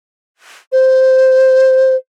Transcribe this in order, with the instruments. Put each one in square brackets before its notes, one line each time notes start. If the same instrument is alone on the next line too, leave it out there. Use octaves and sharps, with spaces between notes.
[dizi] C5